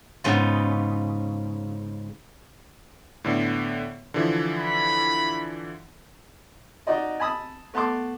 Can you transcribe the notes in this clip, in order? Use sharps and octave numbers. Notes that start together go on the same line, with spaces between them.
G#2 C#3 B3 F4
A2 D3 B3
D3 E3 F3
B5
D#4 F#4 D5 D#5
G#5 A5 B5 D#6 E6
A3 B3 A5 C6 D6